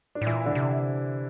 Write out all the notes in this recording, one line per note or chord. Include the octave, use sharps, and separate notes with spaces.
D4
A2
A#2 E3 E4
D3 D4
C3